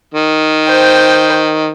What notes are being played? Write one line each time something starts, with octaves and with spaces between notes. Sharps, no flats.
D#3
C5 G5